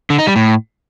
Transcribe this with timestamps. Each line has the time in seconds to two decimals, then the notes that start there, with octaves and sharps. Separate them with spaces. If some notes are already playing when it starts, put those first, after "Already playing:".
0.10 D3
0.19 D#4
0.27 G3
0.36 A2